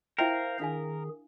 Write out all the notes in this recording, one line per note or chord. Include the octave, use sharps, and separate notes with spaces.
E4 A#4 C5 E5 F5 G5
D#3 D4 G#4 F5 G#5